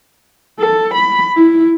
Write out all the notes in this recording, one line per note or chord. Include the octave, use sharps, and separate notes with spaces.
A4
B5
E4